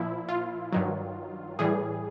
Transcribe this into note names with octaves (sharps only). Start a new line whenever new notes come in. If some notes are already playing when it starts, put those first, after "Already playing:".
Already playing: A#2 F3 E4
F4
G2 D#3 F#3
A2 E3 G3 G#4